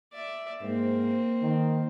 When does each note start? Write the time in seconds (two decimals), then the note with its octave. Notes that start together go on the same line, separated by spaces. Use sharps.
0.13 D5 E5
0.61 G#2 A#3 C4
1.42 D#3